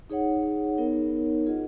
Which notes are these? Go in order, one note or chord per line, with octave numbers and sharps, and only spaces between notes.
D#4 G#4 C#5 F#5
B3 D#4 A#4 C#5
F4 G#4 D#5 F#5